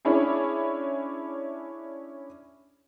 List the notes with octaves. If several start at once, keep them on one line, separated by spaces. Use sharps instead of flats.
C#4 D4 E4 G#4